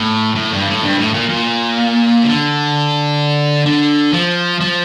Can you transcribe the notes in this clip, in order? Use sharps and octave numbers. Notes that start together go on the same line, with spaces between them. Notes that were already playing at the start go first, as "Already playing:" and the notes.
Already playing: A2
A2
G2
A2
G2
A2
A#2
A#2
D3
D3
F3
F3